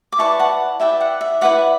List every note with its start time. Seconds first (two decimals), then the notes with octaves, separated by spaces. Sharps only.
0.12 D6
0.19 E4 B4 D5 A5 C#6
0.39 F#5 A5
0.80 E4 B4 D5 E5 G5
1.01 F#5
1.21 E5
1.41 E4 B4 D5 F#5